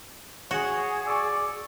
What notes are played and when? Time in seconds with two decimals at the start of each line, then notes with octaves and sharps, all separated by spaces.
0.51 F#4 G#4 C#5
1.07 D5 C#6 E6